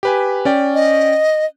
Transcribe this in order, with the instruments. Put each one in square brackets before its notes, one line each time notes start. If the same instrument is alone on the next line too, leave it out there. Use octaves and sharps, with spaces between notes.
[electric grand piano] G4 B4 G#5
C#4 D5 G5
[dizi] D#5